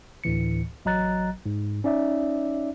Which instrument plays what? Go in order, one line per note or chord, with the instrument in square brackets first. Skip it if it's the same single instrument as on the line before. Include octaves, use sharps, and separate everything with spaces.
[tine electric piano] D2 A2 E3 C#7
A1 F#3 D#5 A#5 F#6 A6
G#2
C#4 D#4 D5 E5